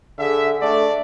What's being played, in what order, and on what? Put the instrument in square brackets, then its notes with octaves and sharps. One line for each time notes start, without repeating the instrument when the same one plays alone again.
[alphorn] D3 [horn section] G#4 E5
[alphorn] A3 [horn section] D4 D5